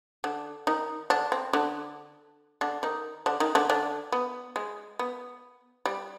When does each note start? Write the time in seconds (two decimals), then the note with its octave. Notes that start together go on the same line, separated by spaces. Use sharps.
0.24 D3 D4
0.67 D#3 D#4
1.10 D3 D4
1.32 C4
1.53 D3 D4
2.61 D3 D4
2.83 D#3 D#4
3.26 D3 D4
3.40 D#3 D#4
3.55 D3 D4
3.70 D3 D4
4.12 B3
4.56 G#3
4.99 B3
5.85 G3